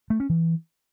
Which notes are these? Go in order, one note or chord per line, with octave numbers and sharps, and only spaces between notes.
A3
C#4
E3